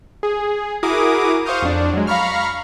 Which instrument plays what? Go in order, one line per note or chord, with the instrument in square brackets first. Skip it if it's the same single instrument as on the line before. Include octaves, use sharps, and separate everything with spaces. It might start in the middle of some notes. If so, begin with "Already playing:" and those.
[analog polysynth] G#4
E4 F#4 G#4 A#4 D6 D#6
C5 F5 C#6 D#6 F6 G6
F2 D4
F#3 G#3
F5 A#5 B5 C#6 F6